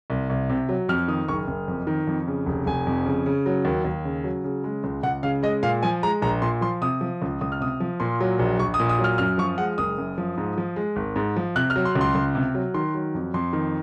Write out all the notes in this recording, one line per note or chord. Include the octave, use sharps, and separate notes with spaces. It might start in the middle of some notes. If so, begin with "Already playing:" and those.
C2
C2
C3
F#3
F2 F6
D#3 D#6
F#1 C#6
F#1
F2
D#3
F2
C#3
F1
F1 G#5
F2
C#3
C#3
F#3
D#2
D#2
C#3
F#3
C#3
G#3
C#2
C#2 F#5
C#3 F5
G#3 D#5
A#2 F5
F3 G#5
G#3 A#5
A#1 A#5
A#2 C6
F3 C6
C3 D#6
F3
C#2
C#2 D#6
F6
C3 D#6
F3
A#2 C6
F#3
A#1
A#1 C#6
D#6
A#2
D#6
F#3
F6
F#2 F6
F3 C#6
G#3 F#5
F#1 D#6
F#2
F3
G#2
F3
G#3
G#1
G#2
F3
C3 F#6
F6
F#3
C6
C#2
C6
C#2
C3
F#3
D#3 C6
F#3
F2
F2 C6
D#3